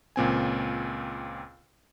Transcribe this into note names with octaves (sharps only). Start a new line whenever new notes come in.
C#2 A#2 C4 G#5